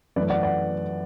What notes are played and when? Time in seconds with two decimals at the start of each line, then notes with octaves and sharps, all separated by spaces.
0.16 F#2 E3 A3 B4 D5
0.30 D5 F#5
0.43 D5 F#5